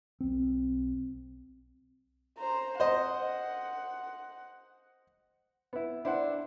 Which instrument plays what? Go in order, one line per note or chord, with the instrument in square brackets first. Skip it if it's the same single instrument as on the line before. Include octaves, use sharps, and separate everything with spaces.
[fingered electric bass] B1 C4
[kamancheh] C5 A#5
[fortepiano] C5 D#5 [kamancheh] F#5
[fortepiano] B3 E4
[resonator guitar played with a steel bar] D4 [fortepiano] E4 C5 F#5